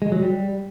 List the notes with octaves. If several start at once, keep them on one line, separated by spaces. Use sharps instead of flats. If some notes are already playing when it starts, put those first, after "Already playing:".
G#3
F#3
G3